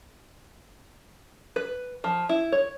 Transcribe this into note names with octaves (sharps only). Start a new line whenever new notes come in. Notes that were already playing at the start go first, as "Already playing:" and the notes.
B4
F3
E4
C#5